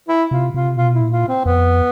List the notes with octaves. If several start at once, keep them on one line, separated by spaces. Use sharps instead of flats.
E4
C3 F4
C3 F4
B2 F4
E4
A#2
F4
C4
F2 B3